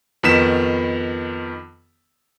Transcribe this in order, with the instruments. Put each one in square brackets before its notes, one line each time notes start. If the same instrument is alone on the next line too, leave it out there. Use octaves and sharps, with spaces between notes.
[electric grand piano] F2 D#3 B3 B6 E7